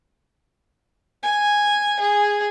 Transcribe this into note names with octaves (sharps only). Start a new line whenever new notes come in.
G#5
G#4